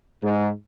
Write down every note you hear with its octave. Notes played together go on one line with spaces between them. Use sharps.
G#2